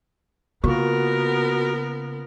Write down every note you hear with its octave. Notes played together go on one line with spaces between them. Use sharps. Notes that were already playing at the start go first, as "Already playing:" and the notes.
C#3 A#3 B3 F4 F#4 A#4